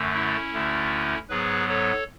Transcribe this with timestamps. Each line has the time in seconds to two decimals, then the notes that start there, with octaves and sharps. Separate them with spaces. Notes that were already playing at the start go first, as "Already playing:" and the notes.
Already playing: F#2 D3 A3
0.13 C#4 E4
0.52 D2 D3 A3
1.29 G#2 F#3 B3 G#4 B4
1.68 A4 C#5